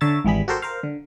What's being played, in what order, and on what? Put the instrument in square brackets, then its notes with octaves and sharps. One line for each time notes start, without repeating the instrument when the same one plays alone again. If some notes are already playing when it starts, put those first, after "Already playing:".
[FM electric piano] D3 C#5 E5 A5 A#5 A6
G#1 E3 G3 G#4 B5
F#4 G4 A4 A#4 C5
A#4 C5 F5
D3